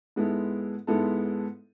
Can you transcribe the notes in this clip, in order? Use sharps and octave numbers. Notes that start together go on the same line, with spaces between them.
G#2 G#3 B3 E4 A4
G#2 G#3 B3 E4 A4